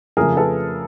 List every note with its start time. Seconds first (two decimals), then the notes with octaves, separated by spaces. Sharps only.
0.17 F2 C#3 F3 A3 G#4 A#4
0.37 A4 B4